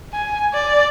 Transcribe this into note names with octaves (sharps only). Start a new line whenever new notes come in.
G#5
D5